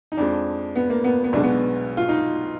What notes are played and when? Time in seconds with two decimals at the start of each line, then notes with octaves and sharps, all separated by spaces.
0.12 D#4
0.17 F2 F3 G#3 D4
0.76 B3
0.90 A#3
1.04 B3
1.24 B3
1.33 B1 B2 G#3 D4
1.43 B3
1.97 F4
2.09 D#4